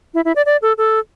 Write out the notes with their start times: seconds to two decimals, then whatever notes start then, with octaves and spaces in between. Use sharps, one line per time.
0.14 E4
0.25 E4
0.36 D5
0.46 D5
0.62 A4
0.78 A4